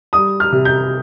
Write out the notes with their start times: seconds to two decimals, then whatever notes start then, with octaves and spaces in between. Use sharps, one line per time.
0.13 G3 D#6
0.40 F6
0.52 C3
0.65 G6